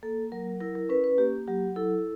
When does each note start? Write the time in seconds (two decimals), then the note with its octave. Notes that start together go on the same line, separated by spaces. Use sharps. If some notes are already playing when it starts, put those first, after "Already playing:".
0.03 A#3 A4
0.32 F#3 A#4
0.61 E4 A#4
0.75 A#4
0.89 C#4 B4
1.04 B4
1.18 A#3 G4
1.48 F#3 G4
1.76 E4 A4